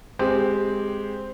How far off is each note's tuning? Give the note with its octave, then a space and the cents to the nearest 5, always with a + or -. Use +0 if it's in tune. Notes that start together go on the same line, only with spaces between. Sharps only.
G#3 +0 C4 -5 G4 +10